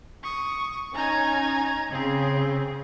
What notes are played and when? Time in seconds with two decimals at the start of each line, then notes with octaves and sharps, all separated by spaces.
0.24 C#6 D#6
0.95 C#4 D#4 G#5 A#5 G#6
1.92 C#3 C4 G#4